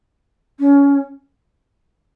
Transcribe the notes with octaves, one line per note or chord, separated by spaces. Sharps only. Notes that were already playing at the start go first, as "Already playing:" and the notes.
C#4